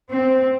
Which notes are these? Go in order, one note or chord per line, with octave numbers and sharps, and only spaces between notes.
C4